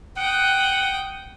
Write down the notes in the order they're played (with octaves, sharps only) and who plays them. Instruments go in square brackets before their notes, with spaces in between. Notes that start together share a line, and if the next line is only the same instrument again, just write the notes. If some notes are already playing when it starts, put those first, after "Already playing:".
[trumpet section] F#5 [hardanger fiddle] G5 D#6